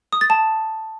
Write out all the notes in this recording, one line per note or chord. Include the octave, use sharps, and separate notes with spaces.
D#6
A6
A5